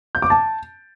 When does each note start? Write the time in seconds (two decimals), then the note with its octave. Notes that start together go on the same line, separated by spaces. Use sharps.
0.15 G6
0.22 D6
0.30 A5